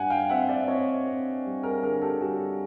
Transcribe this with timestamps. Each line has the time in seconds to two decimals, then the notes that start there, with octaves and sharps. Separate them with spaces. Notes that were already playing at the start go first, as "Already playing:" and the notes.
Already playing: G2 F#5 G#5
0.10 F5 G5
0.29 C4 E5 F#5
0.49 D5 E5
0.68 C4 C#5 D#5
1.06 C4
1.45 G3
1.63 G#4 A#4
1.82 D3 G#4 A#4
2.01 G4 A4
2.21 G3 F#4 G#4